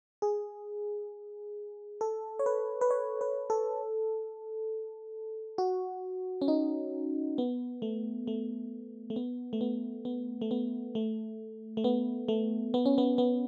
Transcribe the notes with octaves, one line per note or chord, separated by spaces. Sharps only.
G#4
A4
C#5
B4
B4
C#5
B4
A4
F#4
C#4
D#4
B3
A3
A3
A3
B3
A3
B3
B3
A3
B3
A3
A3
B3
A3
B3
C#4
B3
B3